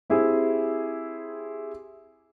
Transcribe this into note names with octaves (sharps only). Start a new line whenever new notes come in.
C4 E4 G4 G#4